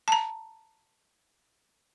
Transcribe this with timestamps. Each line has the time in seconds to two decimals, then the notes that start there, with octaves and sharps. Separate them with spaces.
0.08 A5 A#5